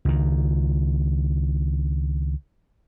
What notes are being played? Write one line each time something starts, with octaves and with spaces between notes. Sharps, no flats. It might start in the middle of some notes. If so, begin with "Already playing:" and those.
C#2 D#3